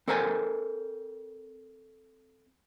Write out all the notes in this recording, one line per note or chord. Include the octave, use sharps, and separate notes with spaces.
C4 A4 A#4 C5 F#5 G#5